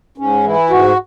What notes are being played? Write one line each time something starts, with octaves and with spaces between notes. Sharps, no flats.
G#2 C#4
E3 E4
G#2 F#4